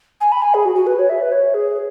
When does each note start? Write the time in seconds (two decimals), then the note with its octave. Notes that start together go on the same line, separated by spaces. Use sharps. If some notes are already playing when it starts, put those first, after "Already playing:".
0.21 G#5
0.32 B5
0.42 G#5
0.54 G#4
0.65 F#4
0.75 F#4
0.87 B4
0.99 C#5
1.10 E5
1.22 B4
1.32 C#5
1.54 G#4